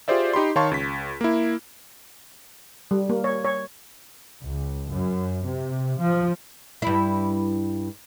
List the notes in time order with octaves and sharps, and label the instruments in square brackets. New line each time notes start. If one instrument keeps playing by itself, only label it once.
[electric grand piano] F4 G4 G#4 C5 D5 E5
D#4 G4 B5 C6
D#3 C#5 F5 A5 C6 C#6
C#2 B6
A#3 E4
[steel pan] G3
A#3
C#5
C#5
[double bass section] C#2
F#2
C3
F3
[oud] G2 E4